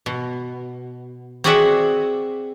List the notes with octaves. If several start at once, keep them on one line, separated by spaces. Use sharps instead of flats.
B2
C4 F#4 G#4 D5 E5 F#5